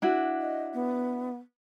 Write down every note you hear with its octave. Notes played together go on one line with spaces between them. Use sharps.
D4 E4 F#4
D#5
B3